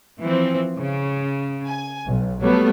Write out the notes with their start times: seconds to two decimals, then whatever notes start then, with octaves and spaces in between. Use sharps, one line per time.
0.19 E3 F3 C4
0.75 C#3
1.66 G#5
2.06 B1
2.41 F#3 G3 A3 B3